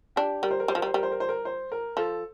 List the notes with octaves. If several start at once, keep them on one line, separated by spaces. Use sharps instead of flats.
D4 G4
G3 A#4
C5
A#4
G3 C5
F3 A#4
G3
C5
G3 A#4
C5
A#4
C5
A#4
C5
A#4
F3 A4